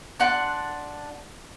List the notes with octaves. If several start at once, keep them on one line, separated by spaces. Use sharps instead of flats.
D4 F#5 C6